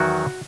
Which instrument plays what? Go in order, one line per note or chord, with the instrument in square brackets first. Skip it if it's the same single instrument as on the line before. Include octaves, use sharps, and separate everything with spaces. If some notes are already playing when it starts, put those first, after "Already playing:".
Already playing: [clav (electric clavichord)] E2 D#3 F#3 F#4